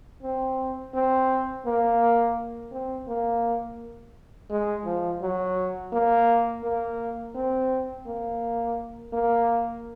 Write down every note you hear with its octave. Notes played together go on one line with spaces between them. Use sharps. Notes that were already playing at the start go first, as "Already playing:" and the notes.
C4
C4
A#3
C4
A#3
G#3
F3
F#3
A#3
A#3
C4
A#3
A#3